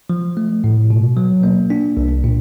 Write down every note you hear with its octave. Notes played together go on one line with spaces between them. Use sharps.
F3
A3
A2
B2
F#3
A#3
D4
C2
A#2